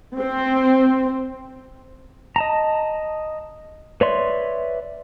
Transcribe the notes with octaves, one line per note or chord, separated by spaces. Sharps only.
C4
D#5 A5 A#5
B4 C#5 D5 E5 C6